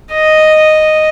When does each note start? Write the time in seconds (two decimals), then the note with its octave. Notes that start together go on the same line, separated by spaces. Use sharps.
0.12 D#5